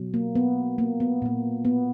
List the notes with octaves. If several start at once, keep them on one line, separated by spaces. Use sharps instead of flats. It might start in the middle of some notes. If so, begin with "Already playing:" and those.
Already playing: B2 F#3
A#3
B3
A#3
B3
A#2 A#3
B3